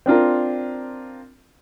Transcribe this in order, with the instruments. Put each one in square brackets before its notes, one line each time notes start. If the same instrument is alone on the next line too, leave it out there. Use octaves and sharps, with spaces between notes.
[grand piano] C4 D4 F4 A#4